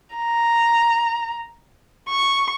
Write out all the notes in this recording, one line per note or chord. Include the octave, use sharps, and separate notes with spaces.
A#5
C#6